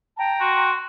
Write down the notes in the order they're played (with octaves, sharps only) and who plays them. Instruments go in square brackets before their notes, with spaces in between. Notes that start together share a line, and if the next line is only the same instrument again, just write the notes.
[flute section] G5 A#5 [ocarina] A5
[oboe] F#4 [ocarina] C6